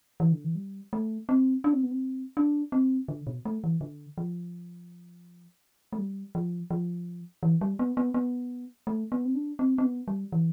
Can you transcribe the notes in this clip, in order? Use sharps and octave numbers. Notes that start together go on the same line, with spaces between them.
E3
D3
E3
G3
A3
C4
D4
C4
B3
C4
D4
C4
D3
B2
A3
E3
D3
F3
A3
G3
F3
F3
E3
G3
B3
B3
B3
A3
B3
C4
D4
C4
C4
B3
G3
E3